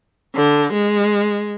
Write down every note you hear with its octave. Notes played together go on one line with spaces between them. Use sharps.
D3
G#3